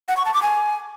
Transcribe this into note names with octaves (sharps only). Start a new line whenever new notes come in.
F#5
C#6
A5
D6
G#5